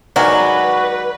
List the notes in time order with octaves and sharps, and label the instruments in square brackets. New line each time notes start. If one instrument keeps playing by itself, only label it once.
[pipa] D#3 F#3 G#3 [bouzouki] F#4 [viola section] B4 [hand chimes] D5